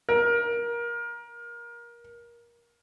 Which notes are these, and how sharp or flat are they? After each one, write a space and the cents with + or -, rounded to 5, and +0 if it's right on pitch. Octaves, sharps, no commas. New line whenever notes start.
A#4 +20